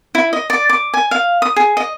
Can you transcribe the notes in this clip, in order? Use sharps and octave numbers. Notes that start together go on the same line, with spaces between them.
E4
D#5
D5
D6
G#5
F5
D#6
G#4
D#5